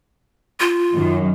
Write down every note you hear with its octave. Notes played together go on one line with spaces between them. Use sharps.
F4
F#2 D#3